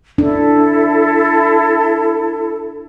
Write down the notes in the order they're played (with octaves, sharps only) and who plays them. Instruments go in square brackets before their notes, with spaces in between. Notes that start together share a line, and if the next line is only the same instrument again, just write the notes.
[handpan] D4 [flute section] E4 A4